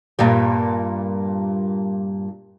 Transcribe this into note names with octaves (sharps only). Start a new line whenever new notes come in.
G2 A#2 G3